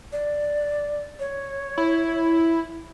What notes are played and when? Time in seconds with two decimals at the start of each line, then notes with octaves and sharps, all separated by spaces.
0.12 D5
1.19 C#5
1.78 E4